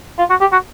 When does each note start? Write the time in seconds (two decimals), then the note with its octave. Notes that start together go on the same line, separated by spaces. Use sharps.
0.18 F4
0.30 F#4
0.41 G4
0.52 F#4